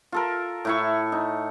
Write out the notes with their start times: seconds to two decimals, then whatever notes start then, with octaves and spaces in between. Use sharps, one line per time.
0.12 F4 A4 A#4
0.65 A2 E4 C#6
1.12 D#4